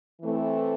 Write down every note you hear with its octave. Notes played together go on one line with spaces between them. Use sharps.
E3 A3 C4